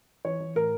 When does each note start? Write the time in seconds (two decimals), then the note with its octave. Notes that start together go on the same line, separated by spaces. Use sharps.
0.25 E3 C#5
0.40 E3
0.55 A2 A#4